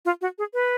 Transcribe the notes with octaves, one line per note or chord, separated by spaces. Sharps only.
F4
F#4
G#4
B4